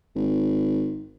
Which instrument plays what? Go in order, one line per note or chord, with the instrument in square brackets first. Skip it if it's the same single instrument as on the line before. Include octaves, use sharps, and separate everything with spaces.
[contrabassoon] G#1